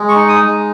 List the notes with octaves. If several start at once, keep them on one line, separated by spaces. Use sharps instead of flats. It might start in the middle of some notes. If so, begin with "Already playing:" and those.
Already playing: G#3
C#6
D#4
D#6
G#3